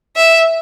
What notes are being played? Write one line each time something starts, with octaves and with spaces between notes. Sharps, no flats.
E5